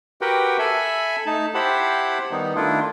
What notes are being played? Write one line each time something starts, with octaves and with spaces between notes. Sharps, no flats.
F#4 G4 A#4 B4 F#5 G5
A4 E5 G#5 B5
A3 D#4 A5
E4 G4 C5 F#5 A5 B5
D#3 G3 B3 D#4
D#3 A3 D4 E4 F4